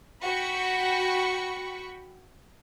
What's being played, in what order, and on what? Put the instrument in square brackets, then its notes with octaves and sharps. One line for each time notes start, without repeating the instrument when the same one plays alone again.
[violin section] F#4 G5 B5 C#6